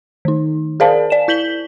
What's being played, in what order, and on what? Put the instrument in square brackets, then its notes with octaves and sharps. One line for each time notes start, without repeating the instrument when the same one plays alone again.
[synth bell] D#3 D#4
G#4 A#4 C5 D5 F5 A5
D5 E7
E4 G6 B6 F#7 G7